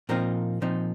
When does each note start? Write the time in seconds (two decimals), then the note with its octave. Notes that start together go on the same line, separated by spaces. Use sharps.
0.09 A#2 F3 C4 D#4 A#4
0.62 A#2 F3 C4 D#4